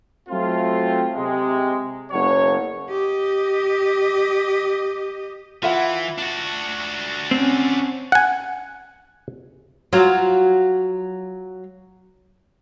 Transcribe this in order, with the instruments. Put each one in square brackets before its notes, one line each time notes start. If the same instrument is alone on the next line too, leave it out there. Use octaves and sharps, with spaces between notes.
[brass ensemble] F#3 A3 C4 F4
C3 G#3
F#1 B2 F#3 C#5
[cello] G4 D#5
[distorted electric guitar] E3 [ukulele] F4 E5 F#5
[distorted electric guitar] D4 F#4
[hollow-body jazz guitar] C4 [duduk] C#4
[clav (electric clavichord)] F#5 G#5
[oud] F#3 F4